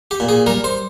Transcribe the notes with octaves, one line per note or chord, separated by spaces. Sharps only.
G4
A#2
G#4
G3 A#4
C5